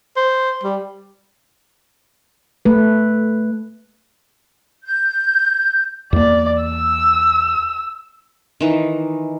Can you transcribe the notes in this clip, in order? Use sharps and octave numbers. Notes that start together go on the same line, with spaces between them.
C5
G3
A3 B4
G6
E2 A#3 D5
E6
D#3 E3